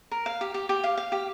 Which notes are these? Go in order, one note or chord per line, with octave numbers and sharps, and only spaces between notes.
A#4
F5
G4
G4
G4
F5
F5
G4